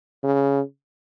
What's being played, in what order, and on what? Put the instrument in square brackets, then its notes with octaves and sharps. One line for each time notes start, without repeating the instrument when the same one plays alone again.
[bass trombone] C#3